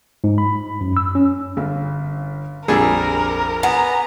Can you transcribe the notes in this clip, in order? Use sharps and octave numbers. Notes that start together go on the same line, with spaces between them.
G#2
B5
F#2
E6
C#4
G1 F5
A#1 F2 G3 D4 G#4 A#4 E6
B3 G#5 A#5